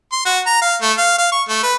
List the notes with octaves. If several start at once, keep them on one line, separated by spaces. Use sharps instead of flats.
C6
F#4
A#5
F5
A3
F5
F5
C#6
A3
B4